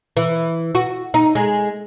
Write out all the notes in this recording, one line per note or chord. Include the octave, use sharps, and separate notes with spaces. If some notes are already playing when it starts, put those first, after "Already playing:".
E3
F#4
D#4
G#3